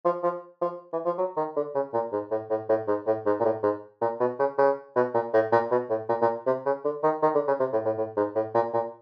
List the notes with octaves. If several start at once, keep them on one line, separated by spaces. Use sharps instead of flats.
F3
F3
F3
E3
F3
F#3
D#3
D3
C#3
A#2
G#2
A2
A2
A2
G#2
A2
G#2
A#2
A2
G#2
A#2
B2
C#3
C#3
B2
A#2
A2
A#2
B2
A2
A#2
A#2
C3
C#3
D3
D#3
D#3
D3
C#3
C3
A2
A2
A2
G#2
A2
A#2
A#2